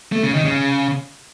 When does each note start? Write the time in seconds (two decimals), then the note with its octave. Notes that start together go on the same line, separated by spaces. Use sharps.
0.12 A3
0.23 C#3
0.34 D#3
0.45 C#3